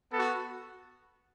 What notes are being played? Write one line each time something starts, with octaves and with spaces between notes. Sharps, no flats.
B3 F#4 A4